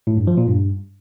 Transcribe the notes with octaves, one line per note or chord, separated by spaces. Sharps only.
A2
G2
F3
A#2
G2